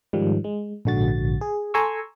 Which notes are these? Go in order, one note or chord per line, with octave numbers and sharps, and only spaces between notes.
G#2 D#3 F3 G3
G#3
A#1 G#2 D3 F#4 A6
G#4
A4 G#5 A#5 C6 C#6 E6